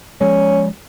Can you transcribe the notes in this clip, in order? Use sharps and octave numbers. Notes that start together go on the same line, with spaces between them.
F3 G#3 C#4